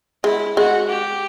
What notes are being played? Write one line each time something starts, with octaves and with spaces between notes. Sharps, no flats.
G#3 E4
G#3 F#4
G4